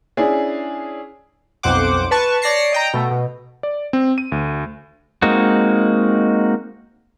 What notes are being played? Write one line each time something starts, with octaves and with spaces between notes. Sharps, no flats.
C#4 D4 E4 G#4
B1 F2 C5 F#5 D6
B4 A5 C#6
C#5 D5 A5 A#6 C7 C#7
D#5 G5 A#5
B2 A3
B2
D5
C4
D#7
D2
G#3 A#3 C4 D#4 F#4